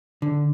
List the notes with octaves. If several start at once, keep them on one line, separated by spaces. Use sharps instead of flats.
D3